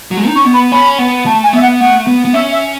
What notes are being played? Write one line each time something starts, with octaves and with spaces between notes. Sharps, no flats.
F#3
G#3
D#4
C#4 C#6
B3
B5
C#4 B5
B3
A3 A5
G#5
B3 E5
F#5
A3 F#5
B3
B3
C#4 E5
E5